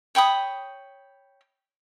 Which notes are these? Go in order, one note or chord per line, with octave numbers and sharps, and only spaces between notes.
C#5 G5 B5 D#6